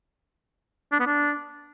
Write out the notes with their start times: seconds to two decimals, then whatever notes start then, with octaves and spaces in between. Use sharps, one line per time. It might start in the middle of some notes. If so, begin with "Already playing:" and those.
0.92 D4
0.99 B3
1.06 D4